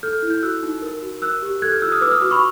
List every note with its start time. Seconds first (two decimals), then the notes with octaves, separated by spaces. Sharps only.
0.03 A4 F6 G6
0.23 E4
0.30 G6
0.43 F#4 E6 F#6
0.63 D#4
0.82 A#4
1.02 F#4
1.22 A#4 E6 F#6
1.42 G4
1.62 A4 F#6 G#6
1.72 F6 G6
1.82 F4 E6 F#6
1.92 D#6 F6
2.01 B4 D6 E6
2.11 D#6 F6
2.21 F#4 D6 E6
2.31 B5 C#6